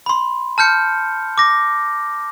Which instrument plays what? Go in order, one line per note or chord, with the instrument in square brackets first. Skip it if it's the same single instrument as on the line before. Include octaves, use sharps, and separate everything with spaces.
[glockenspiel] B5 C6
A5 F6 G6 C#7
D6 A#6